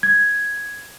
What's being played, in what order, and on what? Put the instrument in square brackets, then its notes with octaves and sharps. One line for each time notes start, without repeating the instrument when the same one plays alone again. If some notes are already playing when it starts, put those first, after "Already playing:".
[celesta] G#6